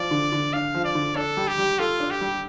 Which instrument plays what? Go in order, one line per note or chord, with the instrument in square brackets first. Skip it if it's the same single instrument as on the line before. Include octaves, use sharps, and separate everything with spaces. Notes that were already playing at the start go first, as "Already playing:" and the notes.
Already playing: [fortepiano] F3 [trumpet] D5
[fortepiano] D3
D3
[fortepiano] D4 [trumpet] F5
[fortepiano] F3
[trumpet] D5
[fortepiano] D3
[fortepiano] D4 [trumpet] A4
[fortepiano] G3
[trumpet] G4
[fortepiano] G3
[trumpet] F4 [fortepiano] A4
[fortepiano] D4
[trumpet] G4
[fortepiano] G3